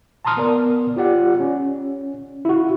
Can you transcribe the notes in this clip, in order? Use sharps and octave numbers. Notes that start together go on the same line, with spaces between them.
A5 A#5 C6 D#6 F6
B3 A#4 D5
F4 G4 D5 F#5
C#4
E4 F#4